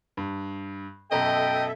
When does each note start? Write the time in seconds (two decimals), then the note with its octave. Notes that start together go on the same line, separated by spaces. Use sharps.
0.17 G2
1.11 F#2 B2 A4 D#5 E5 G5 A#5